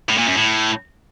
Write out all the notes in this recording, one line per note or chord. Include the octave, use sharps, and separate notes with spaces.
A2
A#2
F#2
A2